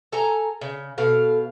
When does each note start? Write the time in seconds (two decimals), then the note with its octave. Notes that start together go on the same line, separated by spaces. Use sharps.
0.12 A4 G#5 A#5
0.61 C#3
0.98 B2 A4 F5